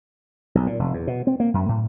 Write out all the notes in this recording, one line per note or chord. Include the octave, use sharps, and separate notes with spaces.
B1
A#2
F1
E2
B2
C4
A#3
F#2
A2